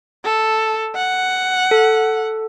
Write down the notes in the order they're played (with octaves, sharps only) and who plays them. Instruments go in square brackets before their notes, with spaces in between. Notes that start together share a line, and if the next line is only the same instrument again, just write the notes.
[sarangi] A4
F#5
[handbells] A4